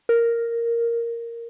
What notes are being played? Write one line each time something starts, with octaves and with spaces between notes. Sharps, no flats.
A#4